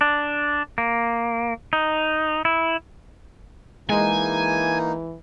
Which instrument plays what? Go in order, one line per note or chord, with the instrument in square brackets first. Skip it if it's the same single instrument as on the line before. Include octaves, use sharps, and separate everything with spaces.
[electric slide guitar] D4
A#3
D#4
E4
[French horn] E3 [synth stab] G#3 [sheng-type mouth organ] A#3 D#4 [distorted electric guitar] G#5